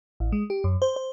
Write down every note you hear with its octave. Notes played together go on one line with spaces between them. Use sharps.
A1
G#3
G4
F#2
C5
C5